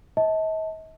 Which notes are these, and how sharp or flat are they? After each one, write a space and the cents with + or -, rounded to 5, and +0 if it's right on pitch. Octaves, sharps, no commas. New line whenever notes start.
D#5 +45 A5 +0